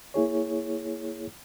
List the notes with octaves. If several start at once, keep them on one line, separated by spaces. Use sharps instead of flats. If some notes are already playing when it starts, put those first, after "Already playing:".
A#3 E4 G#4 C#5